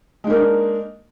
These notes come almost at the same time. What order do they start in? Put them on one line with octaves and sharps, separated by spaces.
G#3 D#4 A#3 A#4 D4